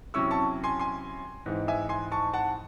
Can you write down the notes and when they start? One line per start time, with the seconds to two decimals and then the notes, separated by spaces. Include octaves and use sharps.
0.14 C3 F#3 C#4 E4 C#6 E6
0.31 A5 C#6
0.64 G#5 C6
0.79 G#5 C6
1.46 G#2 E3 C4 D#4
1.68 E5 G#5
1.89 G#5 C6
2.12 A5 C#6
2.33 F#5 A5